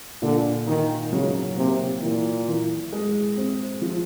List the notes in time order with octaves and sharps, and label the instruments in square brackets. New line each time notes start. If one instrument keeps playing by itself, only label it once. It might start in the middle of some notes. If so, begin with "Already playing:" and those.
[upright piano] A#2 [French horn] D3
[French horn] D#3 [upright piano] D#4
[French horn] C#3 [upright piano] F#3
[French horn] C3 [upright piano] A#3
[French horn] A#2 [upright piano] E3
[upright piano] E3
G#3
C4
F3